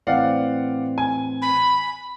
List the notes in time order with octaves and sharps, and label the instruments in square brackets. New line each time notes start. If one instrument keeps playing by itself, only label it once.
[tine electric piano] A2 E3 C4 [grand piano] D5 F5 F#5
[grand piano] G#5
[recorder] B5